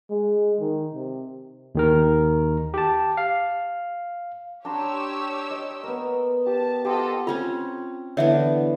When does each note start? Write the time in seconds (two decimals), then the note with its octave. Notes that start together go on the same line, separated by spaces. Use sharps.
0.10 G#3
0.61 D#3
0.95 C3
1.75 D#2 D#3 A#4
2.74 G4 A5
3.17 F5
4.65 D4 G4 C#5 A#5 C6 E6
5.51 D#5
5.83 B3 A#4
6.46 G4 A5
6.85 F4 G4 A4 C5 D#5 F#5
7.27 C4 C#4 F4 A#5
8.17 D3 E3 B3 C#5 E5